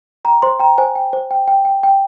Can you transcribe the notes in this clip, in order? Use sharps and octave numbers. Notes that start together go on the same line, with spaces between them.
G5 A#5
C5 C6
G5 A#5
C5 G#5
G5
C5
G5
G5
G5
G5